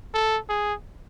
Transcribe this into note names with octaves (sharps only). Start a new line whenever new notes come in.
A4
G#4